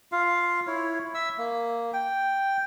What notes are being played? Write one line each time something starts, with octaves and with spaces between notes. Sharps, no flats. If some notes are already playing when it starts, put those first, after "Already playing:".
F4 F5
E4 C#5
E5 E6
A#3
G5